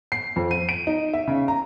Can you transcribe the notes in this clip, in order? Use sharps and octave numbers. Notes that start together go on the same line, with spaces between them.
C7
F2
D#7
D7
D#4
E5
C#3
A#5